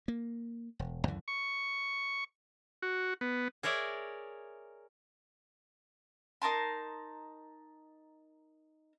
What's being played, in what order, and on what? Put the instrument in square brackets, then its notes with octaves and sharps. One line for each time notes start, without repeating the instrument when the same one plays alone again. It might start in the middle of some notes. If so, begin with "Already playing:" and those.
[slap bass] A#3
E1
C#2 F#2 D3 E3
[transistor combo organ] C#6
F#4
B3
[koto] G#4 A#4 C#5 D5 E5
[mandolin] D#4 A#4 A5 C6